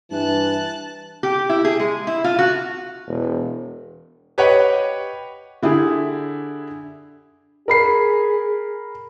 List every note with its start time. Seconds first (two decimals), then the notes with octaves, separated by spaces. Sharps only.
0.11 G2 E3 A5 F#6
1.23 G4
1.49 E4
1.65 G#4
1.80 G#3
2.07 E4
2.24 F4
2.38 F#4
3.07 E1
4.38 G4 B4 C#5 D#5 F#5 G5
5.63 D3 E4 G4 G#4
7.68 G#4 A#4 B5 C7